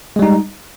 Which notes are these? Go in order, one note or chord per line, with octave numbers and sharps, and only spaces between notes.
G3 G#3 D#4